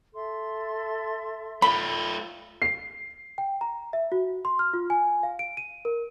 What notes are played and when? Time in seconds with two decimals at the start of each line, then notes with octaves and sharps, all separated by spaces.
0.13 A4 E5 C6
1.62 A3 F4 B5
2.62 C7
3.38 G5
3.61 A#5
3.93 E5
4.12 F#4
4.45 C6
4.59 F6
4.73 F4
4.90 G#5
5.23 F5
5.39 D7
5.57 D#7
5.85 A#4